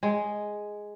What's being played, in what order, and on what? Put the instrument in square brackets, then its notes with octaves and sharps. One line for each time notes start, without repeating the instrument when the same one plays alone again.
[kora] G#3